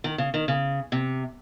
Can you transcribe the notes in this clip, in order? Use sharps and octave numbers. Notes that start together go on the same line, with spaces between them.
D#3
C#3
D#3
C#3
C3